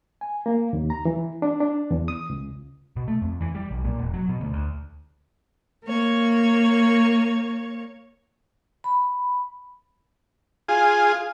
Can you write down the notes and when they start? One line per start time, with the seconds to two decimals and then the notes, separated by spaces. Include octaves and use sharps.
0.21 G#5
0.46 A#3
0.73 D#2
0.90 A#5
1.05 E3
1.42 D4
1.60 D4
1.91 E2
2.08 D#6
2.30 C#2
2.96 B2
3.08 A3
3.22 F2
3.41 E3
3.55 G3
3.71 B1
3.84 A#2
3.99 E1
4.13 F#3
4.29 B2
4.41 D2
4.53 D2
5.83 A#3 C#5
8.84 B5
10.69 F4 G#4